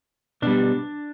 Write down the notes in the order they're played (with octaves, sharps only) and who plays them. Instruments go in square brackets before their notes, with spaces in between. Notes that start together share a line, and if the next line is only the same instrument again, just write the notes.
[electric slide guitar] B2 G3 D4